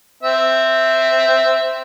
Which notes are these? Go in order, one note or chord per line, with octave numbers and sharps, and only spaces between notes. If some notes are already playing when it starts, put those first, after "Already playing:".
C4 E5